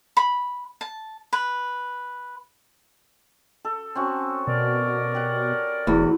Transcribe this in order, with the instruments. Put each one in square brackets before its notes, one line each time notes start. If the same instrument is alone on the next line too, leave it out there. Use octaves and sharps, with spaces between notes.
[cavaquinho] B5
A5
B4
[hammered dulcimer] A4
C4 C#4 F#4
[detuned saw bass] B2 [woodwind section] A#4 D5
[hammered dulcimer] G4 F#5
[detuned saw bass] E1 [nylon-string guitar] E2 [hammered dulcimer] F#3